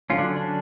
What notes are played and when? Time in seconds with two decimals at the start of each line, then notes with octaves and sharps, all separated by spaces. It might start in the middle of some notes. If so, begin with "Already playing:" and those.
0.10 D3 F#3 C#4 F4
0.18 D4
0.36 D4